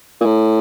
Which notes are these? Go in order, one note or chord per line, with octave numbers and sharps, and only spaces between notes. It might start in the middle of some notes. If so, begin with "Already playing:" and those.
A#2
A2